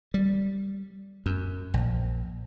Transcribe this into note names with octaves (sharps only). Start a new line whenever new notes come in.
G3
F#2
A#1